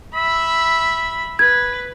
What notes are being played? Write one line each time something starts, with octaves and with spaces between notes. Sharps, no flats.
E5 B5
B4 G#6